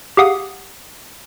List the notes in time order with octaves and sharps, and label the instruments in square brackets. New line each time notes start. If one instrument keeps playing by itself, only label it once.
[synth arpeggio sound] G4 G#4 F5 F#5 D#6